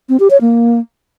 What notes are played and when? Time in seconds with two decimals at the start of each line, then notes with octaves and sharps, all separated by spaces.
0.09 C4
0.20 G4
0.30 C#5
0.41 A#3